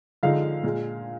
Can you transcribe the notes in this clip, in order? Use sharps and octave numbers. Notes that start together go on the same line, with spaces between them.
D3 F3 G#3 D#4 F5
A#2 G#3